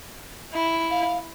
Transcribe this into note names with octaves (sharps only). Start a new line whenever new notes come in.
E4
F5